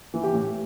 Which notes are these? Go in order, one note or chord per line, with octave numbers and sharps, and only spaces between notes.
E3
G4
A2